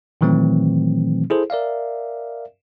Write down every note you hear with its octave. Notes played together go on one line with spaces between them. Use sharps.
A#2 D#3 E3 F#3 A3 C4
E4 G#4 A4 C5
A#4 D5 E5 F5